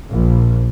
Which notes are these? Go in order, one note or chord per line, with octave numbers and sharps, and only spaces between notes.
A#1